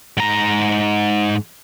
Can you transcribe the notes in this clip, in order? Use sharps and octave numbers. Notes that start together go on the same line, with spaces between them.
G#2 A#5